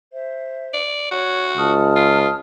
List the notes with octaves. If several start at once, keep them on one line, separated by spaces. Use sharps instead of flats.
C5 E5
D5
F#4 C#5
C#2 A5 D#6 F6
F4